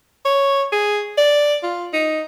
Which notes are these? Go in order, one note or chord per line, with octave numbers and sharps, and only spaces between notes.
C#5
G#4
D5
F4
D#4